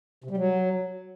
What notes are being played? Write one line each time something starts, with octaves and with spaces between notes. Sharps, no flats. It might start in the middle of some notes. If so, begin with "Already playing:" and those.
C3
G3
F#3